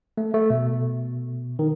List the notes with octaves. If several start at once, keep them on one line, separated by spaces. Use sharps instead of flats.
A3
A3
B2
D#3